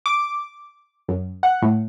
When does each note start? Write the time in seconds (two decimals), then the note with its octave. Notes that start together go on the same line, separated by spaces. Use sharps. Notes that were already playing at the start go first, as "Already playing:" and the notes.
0.06 D6
1.08 F#2
1.43 F#5
1.62 A2